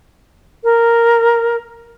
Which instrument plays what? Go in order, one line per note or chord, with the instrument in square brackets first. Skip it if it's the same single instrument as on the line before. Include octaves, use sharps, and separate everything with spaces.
[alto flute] A#4